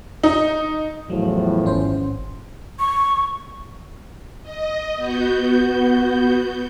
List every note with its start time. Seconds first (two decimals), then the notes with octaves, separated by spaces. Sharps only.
0.23 D#4
1.10 E2 A2 F3 F#3
1.65 G#1 C#4 C5
2.79 C#6
4.42 D#5
4.95 B3 F#4 G6